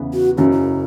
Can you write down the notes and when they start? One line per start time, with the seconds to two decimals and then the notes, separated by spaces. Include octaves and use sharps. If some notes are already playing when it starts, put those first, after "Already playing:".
Already playing: E2 C#3 E3 B3
0.13 F#4
0.37 F#1 F#2 C#3 F#3 E4
0.52 E4